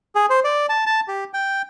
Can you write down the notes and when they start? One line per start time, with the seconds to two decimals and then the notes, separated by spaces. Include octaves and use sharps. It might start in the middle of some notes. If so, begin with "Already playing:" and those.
0.15 G#4
0.30 C5
0.44 D5
0.69 A5
0.86 A5
1.08 G4
1.34 G5